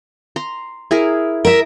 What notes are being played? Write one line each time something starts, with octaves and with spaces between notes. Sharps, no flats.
A#5 C6
E4 G#4 A#4
A#4 E5